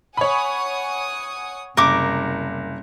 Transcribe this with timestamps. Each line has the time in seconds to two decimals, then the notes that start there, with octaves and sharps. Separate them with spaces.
0.17 C#5 F#5 G#5 B5 D#6
1.77 F#1 C2 A#4 D6